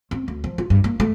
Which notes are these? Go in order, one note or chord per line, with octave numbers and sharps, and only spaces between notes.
C4
D2
F3
F4
G2
A#3
A3